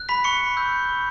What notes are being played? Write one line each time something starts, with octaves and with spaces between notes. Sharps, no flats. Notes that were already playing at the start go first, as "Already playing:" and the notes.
Already playing: F#6
B5 B6
C#6 C#7
E6 G6
C#6